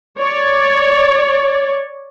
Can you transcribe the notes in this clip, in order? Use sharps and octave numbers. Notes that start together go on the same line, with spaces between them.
C#5 D5